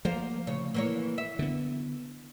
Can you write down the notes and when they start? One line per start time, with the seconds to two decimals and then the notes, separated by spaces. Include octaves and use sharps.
0.05 F3 A#3 C5 F5
0.47 D2 C#3 C#5
0.74 E3 A#3 C#5
1.18 E5
1.39 D3 B3